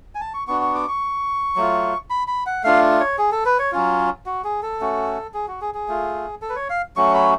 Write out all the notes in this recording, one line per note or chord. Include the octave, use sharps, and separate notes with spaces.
G#5
A5
C#6
B3 D4 F#4 C#6
C#6
D6
C#6
F#3 A3 F4
B5
B5
F#5
A3 D4 F4 F5
C#5
G#4
A4
B4
C#5
F#3 C#4 F4
F#4
G#4
A4
A3 C#4 F#4
G#4
F#4
G#4
G#4
A3 F4
A4
B4
C#5
F5
F#3 A3 C#4 F#4 C#6
B5